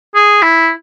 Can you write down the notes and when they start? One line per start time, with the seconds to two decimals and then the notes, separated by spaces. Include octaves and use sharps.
0.15 G#4
0.42 E4